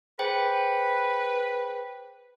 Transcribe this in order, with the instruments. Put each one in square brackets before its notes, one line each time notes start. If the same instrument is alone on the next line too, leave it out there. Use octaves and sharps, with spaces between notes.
[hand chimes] G#4 C5 G5 [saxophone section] B4